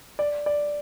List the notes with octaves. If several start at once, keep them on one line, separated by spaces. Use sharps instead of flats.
D5
D5